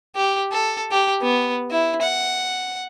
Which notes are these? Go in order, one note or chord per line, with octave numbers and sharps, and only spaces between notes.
G4
A4
G4
B3
E4
F#5